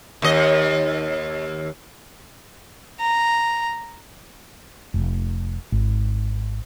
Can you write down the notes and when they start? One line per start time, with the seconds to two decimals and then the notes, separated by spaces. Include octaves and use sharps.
0.22 D#2 D#5
3.00 A#5
4.94 F1
5.72 G#1